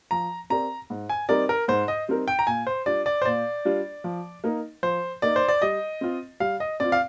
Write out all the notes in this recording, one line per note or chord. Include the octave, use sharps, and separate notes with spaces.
F3 A#5
C4 G4 A#4 D5 A#5
G#2
G#5
G3 C4 D#4 A#4 D5
A#4
G#2 C5
D#5
G3 C4 D#4 A#4
G5
A#5
A#2 G#5
C5
G3 D4 F4 D5
D5
C5
A#2 D5
G3 D4 F4
F3
A#3 D#4 A#4 D#5
F3 C5
A#3 D#4 A#4 D5 D#5
C5
D5
G3 D#5
C4 F4
G3 F5
D#5
C4 F4 D5
F5